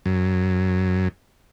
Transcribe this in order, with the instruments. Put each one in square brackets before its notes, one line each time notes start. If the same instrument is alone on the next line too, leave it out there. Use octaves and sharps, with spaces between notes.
[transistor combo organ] F#2